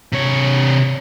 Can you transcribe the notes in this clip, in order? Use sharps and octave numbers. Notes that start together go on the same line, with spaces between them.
C3 C#5